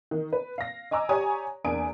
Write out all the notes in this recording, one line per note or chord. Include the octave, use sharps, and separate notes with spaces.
D#3
B4
F5 A#6
D#5 G#5 A#5 D6 E6
G4 C#5 D5 G#5 A#5 D#6
E2 A#3 D4 G#5 D#6 D7